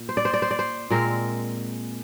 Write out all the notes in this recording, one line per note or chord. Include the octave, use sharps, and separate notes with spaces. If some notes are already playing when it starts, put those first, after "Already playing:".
Already playing: A#2
C5
D5
C5
D5
C5
D5
C5
A#2 G#3 C4 A#4